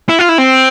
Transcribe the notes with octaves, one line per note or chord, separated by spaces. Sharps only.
E4
F4
E4
C4